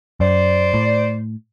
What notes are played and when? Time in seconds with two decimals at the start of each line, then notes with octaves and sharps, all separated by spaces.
0.20 F#2 C5 D5
0.74 A2